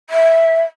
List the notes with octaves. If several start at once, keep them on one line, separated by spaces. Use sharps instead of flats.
E5